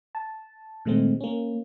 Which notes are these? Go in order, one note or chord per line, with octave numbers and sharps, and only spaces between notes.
A5
A#2 D#3 G#3 A3 C4
A#3 C#4